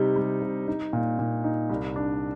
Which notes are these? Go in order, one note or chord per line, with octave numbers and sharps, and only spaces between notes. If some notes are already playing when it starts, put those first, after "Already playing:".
Already playing: C3 G3 D#4
G3
C3
D#4
A#2
A#2
D#4
C2
D4